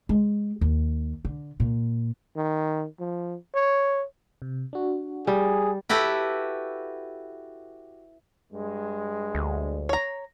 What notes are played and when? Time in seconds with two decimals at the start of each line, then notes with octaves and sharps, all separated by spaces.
0.09 G#3
0.61 D#2
1.25 D3
1.60 A#2
2.36 D#3
2.99 F3
3.55 C#5
4.42 C3
4.73 D4 F#4
5.27 G3 G#4
5.89 E4 F#4 G4 A4 B4
8.53 G2 G#3
9.35 D2
9.89 C#5 A#5